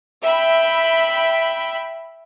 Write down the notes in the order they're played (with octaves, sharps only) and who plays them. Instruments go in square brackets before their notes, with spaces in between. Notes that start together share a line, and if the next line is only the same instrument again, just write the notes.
[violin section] E5 G5 B5